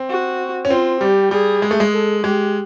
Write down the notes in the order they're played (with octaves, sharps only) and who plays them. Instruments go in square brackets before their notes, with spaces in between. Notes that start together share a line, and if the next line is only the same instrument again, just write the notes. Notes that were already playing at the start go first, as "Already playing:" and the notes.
Already playing: [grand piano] C4
[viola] F#4
[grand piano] C#4
[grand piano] C4 [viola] F4
[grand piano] G3 [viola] G4
[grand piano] G3 [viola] G#4
[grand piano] G#3
A3
G#3
[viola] A4
[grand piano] G#3 [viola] G4